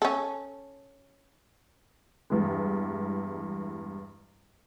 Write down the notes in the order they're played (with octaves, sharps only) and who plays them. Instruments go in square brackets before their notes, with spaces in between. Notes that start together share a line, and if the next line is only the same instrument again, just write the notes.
[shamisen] C#4 A4
[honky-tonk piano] E2 G2 E3 G#3